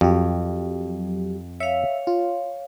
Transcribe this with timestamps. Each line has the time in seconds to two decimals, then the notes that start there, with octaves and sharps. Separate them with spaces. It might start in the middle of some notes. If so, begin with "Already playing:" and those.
0.01 F2 F#3 G4
1.60 C#5 E5 F5
2.07 F4